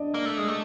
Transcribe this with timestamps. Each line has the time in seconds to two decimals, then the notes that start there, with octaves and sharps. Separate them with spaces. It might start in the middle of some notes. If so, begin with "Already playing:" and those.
Already playing: D4 D5 D#5
0.14 A#3
0.26 A3
0.38 G#3
0.48 A3